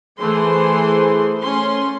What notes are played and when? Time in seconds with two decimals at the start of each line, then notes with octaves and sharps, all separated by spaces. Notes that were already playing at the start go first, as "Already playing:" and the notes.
0.20 E3 A3 G#4 C5 C6
1.42 A3 C#4 C6